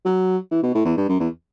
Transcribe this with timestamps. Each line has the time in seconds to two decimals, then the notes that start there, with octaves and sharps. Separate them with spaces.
0.05 F#3
0.51 E3
0.62 B2
0.74 A2
0.85 E2
0.97 G2
1.09 F#2
1.20 E2